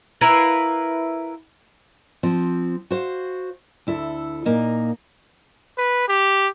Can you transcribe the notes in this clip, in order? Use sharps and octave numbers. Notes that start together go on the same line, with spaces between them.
E4 A#4 B4 F5
F3 C4
F#4 C5 F5
D2 E4 A4
A#2 A#3 D#4 D#5
B4
G4